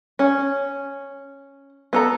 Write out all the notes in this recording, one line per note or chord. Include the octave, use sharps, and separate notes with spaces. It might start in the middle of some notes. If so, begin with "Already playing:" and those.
C#4
B3 A4 A#5